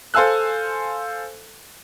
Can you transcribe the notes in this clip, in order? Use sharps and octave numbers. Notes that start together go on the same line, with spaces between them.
A4 C5 F5 G#5 E6 F#6